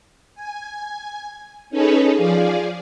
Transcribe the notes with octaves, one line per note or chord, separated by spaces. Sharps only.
G#5
C#4 D#4 G#4 A4 B4 C#5
F3 G#4 D5 F5